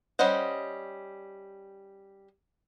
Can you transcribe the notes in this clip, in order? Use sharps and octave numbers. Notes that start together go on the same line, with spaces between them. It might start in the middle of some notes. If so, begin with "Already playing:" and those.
G3 C#4 C5 D#5 F#5